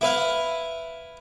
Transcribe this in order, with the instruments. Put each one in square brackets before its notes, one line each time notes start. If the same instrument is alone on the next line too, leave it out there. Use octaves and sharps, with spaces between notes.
[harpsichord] E4 B4 F5